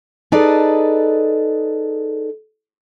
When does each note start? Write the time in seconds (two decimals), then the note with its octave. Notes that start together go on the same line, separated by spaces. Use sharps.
0.32 D#4 G#4 A4 B4 D5